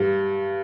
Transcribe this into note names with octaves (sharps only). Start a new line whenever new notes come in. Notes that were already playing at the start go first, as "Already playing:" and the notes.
Already playing: G2